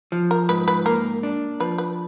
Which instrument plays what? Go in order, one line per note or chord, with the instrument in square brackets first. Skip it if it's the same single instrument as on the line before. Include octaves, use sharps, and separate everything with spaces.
[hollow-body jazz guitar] F3
[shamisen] A#4
[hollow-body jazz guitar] G#2 [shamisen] B4
[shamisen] B4
[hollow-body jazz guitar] A#3 [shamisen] A#4
[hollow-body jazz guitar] D4
[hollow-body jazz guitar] F3 [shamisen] B4
[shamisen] B4